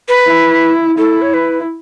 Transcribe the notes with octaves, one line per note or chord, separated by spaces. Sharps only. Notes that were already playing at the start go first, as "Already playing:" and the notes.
B4
E4
E4 A4
C#5
B4